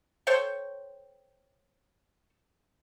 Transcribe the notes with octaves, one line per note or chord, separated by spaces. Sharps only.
A4 C5 C#5 G5